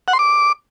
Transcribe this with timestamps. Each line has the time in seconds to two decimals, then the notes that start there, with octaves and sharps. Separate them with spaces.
0.08 F#5
0.13 C6
0.19 D6